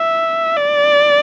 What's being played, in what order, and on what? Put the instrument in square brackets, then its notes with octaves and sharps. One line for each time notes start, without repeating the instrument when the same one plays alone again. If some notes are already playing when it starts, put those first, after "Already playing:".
Already playing: [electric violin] E5
D5